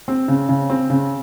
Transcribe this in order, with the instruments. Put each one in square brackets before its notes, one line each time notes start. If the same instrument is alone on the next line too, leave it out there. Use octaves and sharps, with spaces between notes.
[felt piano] C4
C#3
C#3
C4
C#3